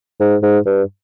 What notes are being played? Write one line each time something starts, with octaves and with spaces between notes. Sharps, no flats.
G#2
G#2
G2